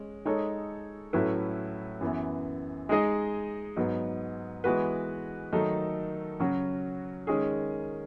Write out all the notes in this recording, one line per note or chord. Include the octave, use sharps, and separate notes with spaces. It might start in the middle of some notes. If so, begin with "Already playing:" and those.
Already playing: G#3 C#4
G#3 D#4 A4 C#5
A2 F#3 C#4 E4 B4
F#2 E3 B3
G#3 D#4 G#4 D#5
G#2 F#3 B3
E3 G#3 B3 F#4 B4
D#3 F#3 A3 D#4 A4
C#3 F#3 C#4 F#4
D#3 G#3 C#4 G#4